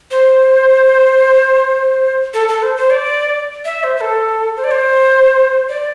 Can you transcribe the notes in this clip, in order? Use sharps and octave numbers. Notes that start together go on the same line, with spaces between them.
C5
A4
A4
C5
C5
D5
E5
C5
C5
A4
C5
D5
C5
D5